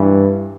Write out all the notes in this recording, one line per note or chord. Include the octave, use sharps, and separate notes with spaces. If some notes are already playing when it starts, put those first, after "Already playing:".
Already playing: G2 E3